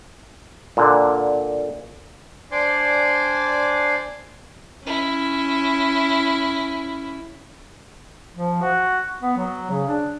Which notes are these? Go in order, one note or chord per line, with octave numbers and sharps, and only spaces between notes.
A#2 D3
D4 C5 D5 G#5 C6 D6
C#4 E4
F3
F#4
B3
F#3
C#3
D4